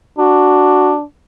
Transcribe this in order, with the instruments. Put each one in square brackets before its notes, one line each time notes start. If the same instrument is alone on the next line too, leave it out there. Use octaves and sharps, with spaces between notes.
[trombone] D4 [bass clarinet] F#4